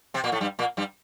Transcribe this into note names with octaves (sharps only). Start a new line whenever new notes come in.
C3 C4
A#2 A#3
A2 A3
G2 G3
A#2 A#3
G2 G3